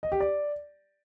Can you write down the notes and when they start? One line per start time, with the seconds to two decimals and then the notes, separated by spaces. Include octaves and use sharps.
0.03 D#5
0.12 G4
0.20 D5